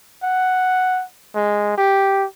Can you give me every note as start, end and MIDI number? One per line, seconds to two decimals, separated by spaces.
0.24 1.04 78
1.36 1.74 56
1.78 2.25 67